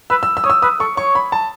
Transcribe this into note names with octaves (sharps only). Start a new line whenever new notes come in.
B4 E6
E6
E6
C#5 D#6
E6
B4 D#6
A4 C#6
C#5 C#6
B5
A5